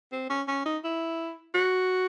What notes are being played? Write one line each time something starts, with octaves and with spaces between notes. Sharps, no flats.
C4
C#4
C#4
D#4
E4
F#4